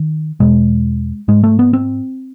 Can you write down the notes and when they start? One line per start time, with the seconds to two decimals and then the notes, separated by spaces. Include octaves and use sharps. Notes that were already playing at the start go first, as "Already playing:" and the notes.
Already playing: D#3
0.40 E2 B2 G#3
1.28 G#2 G#3
1.43 A3
1.59 B3
1.73 C4